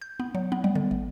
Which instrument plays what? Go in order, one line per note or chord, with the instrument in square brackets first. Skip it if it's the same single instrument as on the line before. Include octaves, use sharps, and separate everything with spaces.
[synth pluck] G6
B3
F#3
B3
G3
D3
G#1